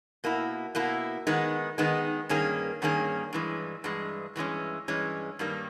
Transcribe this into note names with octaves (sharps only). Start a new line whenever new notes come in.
B2 A#3 E4
B2 A#3 E4
D#3 G#3 B3 D#4
D#3 G#3 B3 D#4
G2 D#3 A#3 C#4 G#4
G2 D#3 A#3 C#4 G#4
G2 E3 G#3
G2 E3 G#3
G2 E3 G#3 C#4
G2 E3 G#3 C#4
G2 D#3 G3 A#3